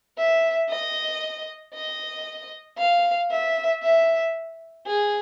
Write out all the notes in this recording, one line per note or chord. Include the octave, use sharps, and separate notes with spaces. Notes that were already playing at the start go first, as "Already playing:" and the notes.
E5
D#5
D#5
F5
E5
E5
G#4